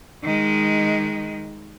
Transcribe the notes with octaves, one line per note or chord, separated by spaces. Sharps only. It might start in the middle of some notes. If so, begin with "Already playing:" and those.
D#3 G#3